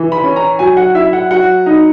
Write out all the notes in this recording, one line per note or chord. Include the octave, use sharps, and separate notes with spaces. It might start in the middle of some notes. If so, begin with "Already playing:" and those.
Already playing: E3
B5
C#4
A#5
F#3 G#5
F#5
E4 E5
F#5
F#3 F#5
D#4